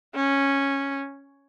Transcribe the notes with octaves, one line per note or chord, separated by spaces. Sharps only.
C#4